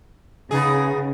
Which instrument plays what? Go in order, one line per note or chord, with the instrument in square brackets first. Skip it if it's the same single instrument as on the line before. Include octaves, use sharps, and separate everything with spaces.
[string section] C#3 [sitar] B3 D#4 G#4